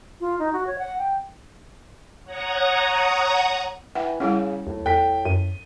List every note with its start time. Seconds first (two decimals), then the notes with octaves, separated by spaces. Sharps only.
0.21 F4
0.39 D#4
0.53 F#4
0.67 C#5
0.79 F#5
0.98 G5
2.24 C#5 F#5 A#5 C#6 D#6
3.95 E3 E5 F#5 G5
4.20 C#3 G3 C#4 E4 F#5
4.67 D#2 A2
4.86 E2 A4 G5 B6
5.25 F#2 D#7